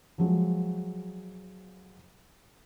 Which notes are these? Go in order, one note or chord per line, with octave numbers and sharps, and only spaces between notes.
F3 F#3 G#3